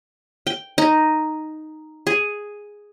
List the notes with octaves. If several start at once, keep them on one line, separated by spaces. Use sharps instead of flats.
G5
D#4
G#4